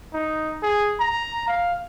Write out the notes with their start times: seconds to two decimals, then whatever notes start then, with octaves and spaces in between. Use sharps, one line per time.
0.13 D#4
0.63 G#4
1.00 A#5
1.48 F5